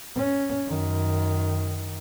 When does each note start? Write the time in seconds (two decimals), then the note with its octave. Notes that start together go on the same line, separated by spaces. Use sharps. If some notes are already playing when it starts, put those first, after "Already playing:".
0.16 C#4
0.66 F#2 D#3